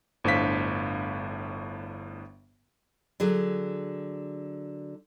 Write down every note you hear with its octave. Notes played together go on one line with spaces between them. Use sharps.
G1 A2 D4 C5 F5 B6
D3 F#3 G#4